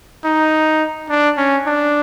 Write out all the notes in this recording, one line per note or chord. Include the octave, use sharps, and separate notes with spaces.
D#4
D4
C#4
D4